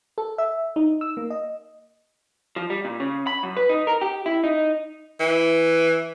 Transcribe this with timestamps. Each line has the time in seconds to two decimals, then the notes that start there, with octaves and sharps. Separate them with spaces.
0.18 A4
0.38 E5
0.76 D#4
1.01 E6
1.17 A#3
1.30 D#5
2.56 F3
2.70 G3
2.85 A#2
3.00 C#3
3.27 B5
3.43 F#2
3.57 B4
3.69 D#4
3.87 A#4
4.01 G4
4.26 E4
4.44 D#4
5.20 E3